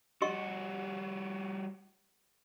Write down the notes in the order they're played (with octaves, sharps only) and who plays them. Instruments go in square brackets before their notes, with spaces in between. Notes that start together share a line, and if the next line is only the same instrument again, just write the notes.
[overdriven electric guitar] G3 F#4 [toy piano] G4 D#5 C#6